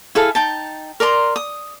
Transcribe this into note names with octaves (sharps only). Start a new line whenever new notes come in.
E4 G#4 A4 F5
D#4 G5 A5
A#4 D5 A#5 C6
D#6